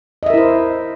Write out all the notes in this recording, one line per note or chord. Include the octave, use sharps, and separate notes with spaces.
E4 A#4 C5 D#5 E5